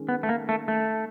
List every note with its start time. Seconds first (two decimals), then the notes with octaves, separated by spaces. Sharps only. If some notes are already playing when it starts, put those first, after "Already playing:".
Already playing: D#3 G#3 C#4
0.09 B3
0.23 A3
0.29 A#3
0.49 A3
0.68 A3